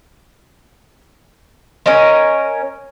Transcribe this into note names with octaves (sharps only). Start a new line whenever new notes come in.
C#4 A#4 C#5 D#5